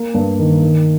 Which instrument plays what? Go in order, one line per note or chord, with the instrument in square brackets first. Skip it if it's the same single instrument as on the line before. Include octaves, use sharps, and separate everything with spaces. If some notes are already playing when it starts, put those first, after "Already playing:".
Already playing: [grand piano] A#3
G2
D#3
D#3